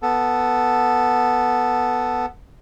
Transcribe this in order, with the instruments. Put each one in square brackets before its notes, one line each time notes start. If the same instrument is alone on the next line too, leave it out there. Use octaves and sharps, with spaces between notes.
[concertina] B3 A4